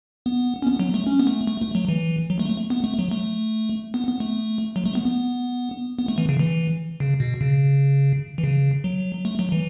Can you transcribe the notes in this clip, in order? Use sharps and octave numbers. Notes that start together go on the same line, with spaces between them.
B3
C#4
B3
F#3
A3
C#4
B3
A3
A3
A3
F#3
E3
F#3
A3
A3
B3
A3
F#3
A3
B3
B3
A3
F#3
A3
B3
B3
B3
A3
E3
C#3
E3
C#3
B2
C#3
E3
C#3
F#3
A3
F#3
E3